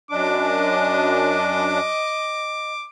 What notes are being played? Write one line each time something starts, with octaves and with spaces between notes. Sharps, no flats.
F#2 D4 D#5 D6